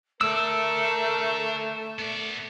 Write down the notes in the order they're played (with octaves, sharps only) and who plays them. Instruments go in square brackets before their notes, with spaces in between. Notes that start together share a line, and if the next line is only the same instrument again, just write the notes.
[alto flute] A3 [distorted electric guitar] A4 D5 [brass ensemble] A#4 [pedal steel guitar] E6
[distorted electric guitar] B3 D5